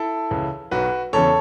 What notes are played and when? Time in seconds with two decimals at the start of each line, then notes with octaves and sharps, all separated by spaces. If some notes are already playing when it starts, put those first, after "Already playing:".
Already playing: E4 A4
0.30 C#2 C#3 E3
0.71 B1 B2 F#4 B4
1.13 E1 E2 C#3 A4 C#5